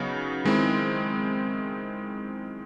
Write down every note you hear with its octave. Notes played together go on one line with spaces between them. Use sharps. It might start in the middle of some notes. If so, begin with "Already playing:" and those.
Already playing: C#3 F#3 B3 D#4
D#3 G#3 C4 E4